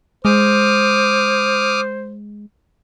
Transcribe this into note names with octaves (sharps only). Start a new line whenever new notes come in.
G#3 C5 D6 D#6 F6